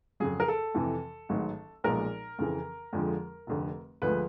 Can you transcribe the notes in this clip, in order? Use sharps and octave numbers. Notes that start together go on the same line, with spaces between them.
F2 C#3 F#3 G#4
A#4
A4
F2 C3 E3
A1 G#2 D#3 F#3
B1 A#2 F3 G#3 A#4
F2 C#3 E3
F2 D3 F3 G#3
F1 F2 D3
D2 D3 F3 G#3 B4